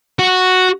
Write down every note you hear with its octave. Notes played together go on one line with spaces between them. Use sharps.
F#4